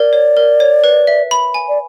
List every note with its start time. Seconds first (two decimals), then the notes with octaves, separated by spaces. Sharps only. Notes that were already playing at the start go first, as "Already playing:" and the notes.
Already playing: A#4 D5
0.13 C#5
0.37 A#4
0.60 C#5
0.84 B4
1.07 E5
1.31 B5
1.54 G#5
1.69 D5